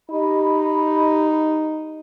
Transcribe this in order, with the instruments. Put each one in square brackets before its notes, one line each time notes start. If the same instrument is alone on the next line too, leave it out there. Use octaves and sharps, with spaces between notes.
[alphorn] D#4 [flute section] G4 D#5 B5